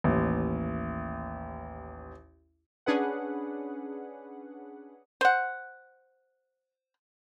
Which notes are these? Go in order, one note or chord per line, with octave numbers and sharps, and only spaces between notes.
A1 D#2
C#4 D4 G#4 B4 F#5
C5 F#5